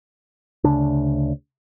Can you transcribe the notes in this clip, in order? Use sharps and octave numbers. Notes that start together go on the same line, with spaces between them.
D2 C#3 D4